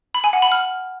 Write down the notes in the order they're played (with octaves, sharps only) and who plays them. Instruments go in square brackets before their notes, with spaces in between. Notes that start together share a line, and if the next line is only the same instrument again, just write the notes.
[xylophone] B5
G#5
F#5
B5
F6